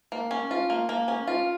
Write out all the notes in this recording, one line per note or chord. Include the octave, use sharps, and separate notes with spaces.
A#3
C#4
F4
A#3
A#3
C#4
F4